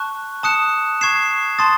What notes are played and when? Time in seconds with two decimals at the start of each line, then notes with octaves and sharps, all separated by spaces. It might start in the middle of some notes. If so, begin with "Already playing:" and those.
Already playing: A5 C#6 F#6
0.43 A5 D#6 F#6 C#7 E7
1.01 C#6 G#6 C7 E7
1.59 A5 C6 D#6 A6